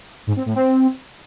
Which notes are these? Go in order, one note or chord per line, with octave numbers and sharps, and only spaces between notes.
G#2
C4
A2
C4